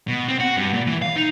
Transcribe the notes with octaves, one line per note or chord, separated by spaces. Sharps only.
B2
C4
F#4
G2
A#2
E3
F5
D#4